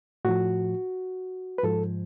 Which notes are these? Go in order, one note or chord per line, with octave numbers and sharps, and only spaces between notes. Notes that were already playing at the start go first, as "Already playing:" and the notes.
A2 F3 F#4
B4
G#2 F3 A4